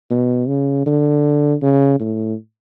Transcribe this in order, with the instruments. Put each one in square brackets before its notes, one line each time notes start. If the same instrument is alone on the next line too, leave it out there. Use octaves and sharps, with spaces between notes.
[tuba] B2
C#3
D3
C#3
A2